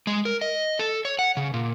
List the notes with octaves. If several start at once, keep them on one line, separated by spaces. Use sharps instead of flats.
G#3
A#4
D#5
A4
C#5
F#5
C#3
A#2